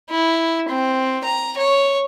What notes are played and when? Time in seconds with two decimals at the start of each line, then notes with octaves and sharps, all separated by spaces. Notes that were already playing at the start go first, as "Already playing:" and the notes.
0.10 E4
0.69 C4
1.24 A#5
1.57 C#5